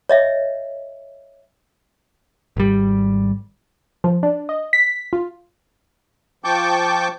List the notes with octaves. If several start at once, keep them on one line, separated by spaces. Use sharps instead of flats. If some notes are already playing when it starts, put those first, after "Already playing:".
C#5 D#5 E5
G#1 G3
F3
D4
D#5
B6
F4
F3 G5 A5 C#6 D6 G6